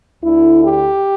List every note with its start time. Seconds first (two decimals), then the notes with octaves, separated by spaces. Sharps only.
0.23 D2 D3 E4
0.65 G4